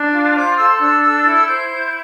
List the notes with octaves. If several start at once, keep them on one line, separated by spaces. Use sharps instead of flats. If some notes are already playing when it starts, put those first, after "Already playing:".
Already playing: D4
F4
C5 D6
A4 E6
D4 E6
A4 E6
E4
C5 G6
E4